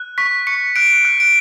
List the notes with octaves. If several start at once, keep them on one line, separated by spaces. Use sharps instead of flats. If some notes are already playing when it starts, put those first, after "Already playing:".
Already playing: F#6
C#6 B6
C#6 C#7
F#6 D7
F#6
D7